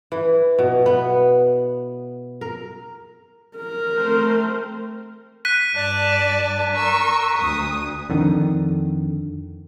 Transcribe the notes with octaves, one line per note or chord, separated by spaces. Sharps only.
E3
B2
B3
A#4
A#4
A3 C4 C5
F#6 B6 D#7
G2 D5 A5
A#4 C#6 E6
D2 D#6
F2 D3 D#3